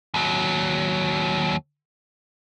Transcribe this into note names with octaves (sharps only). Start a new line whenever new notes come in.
D#2 F#3